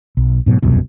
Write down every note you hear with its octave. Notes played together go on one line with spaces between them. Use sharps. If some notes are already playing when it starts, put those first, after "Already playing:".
B1
G#2 B2 F#3
E1 C2 F#2 B2